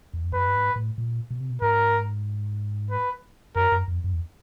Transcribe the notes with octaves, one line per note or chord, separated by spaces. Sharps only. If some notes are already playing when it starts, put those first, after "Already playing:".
E2
F2
F#2 B4
G2
G#2
A2
A#2
B2
C3
B2
G#2 A#4
B4
F#2 A#4
F#2
F2
F#2
E2